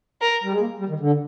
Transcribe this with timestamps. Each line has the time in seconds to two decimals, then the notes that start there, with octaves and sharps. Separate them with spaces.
0.21 A#4
0.44 G3
0.51 G#3
0.60 A#3
0.80 G3
0.89 D#3
1.00 D3